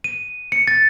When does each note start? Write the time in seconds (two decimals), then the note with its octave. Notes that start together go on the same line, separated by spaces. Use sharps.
0.04 D#7
0.52 C#7
0.68 A6